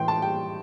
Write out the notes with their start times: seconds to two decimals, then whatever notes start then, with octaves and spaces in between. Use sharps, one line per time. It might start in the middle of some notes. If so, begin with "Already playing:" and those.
Already playing: A2 E3 G5 C6
0.08 A5
0.22 G3 G5